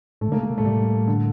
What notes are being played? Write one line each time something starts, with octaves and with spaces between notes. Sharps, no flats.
A2 A3
D3
C3 A#3
A3
C3
A#2 A3
A2 G3
D3